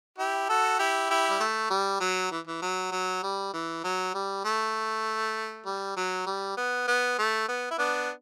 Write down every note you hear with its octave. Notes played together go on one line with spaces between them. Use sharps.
E4 G4
F#4 A4
E4 G4
E4 G4
G3
A3
G3
F#3
E3
E3
F#3
F#3
G3
E3
F#3
G3
A3
G3
F#3
G3
B3
B3
A3
B3
E4
B3 D4